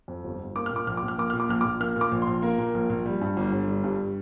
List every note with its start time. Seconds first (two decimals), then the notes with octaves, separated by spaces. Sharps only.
0.08 F2
0.24 G1
0.39 G1
0.56 A#3 D6
0.66 A#2 F6
0.76 D6
0.87 A#1 F6
0.97 A#1 D6
1.08 F6
1.18 A#3 D6
1.30 A#2 F6
1.40 D6
1.49 A#1 F6
1.61 D6
1.65 A#1
1.80 A#3 F6
1.96 A#2
2.01 D6
2.11 A#1
2.22 C6
2.27 A#1
2.42 A#3 A#4
2.58 A#2
2.74 A#1
2.90 A#1
3.06 G3
3.21 G2
3.37 G1
3.52 G1
3.68 G3
3.84 G2